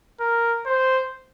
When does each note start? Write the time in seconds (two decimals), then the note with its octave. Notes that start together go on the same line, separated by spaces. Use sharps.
0.20 A#4
0.66 C5